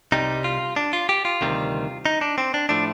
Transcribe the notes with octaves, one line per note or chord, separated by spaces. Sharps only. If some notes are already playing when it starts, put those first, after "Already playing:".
C2 C3 G3 D#4
F4
D4
F4
G4
F4
D2 C3 D#3 G3
D#4
D4
C4
D4
A2 F3 A3 D4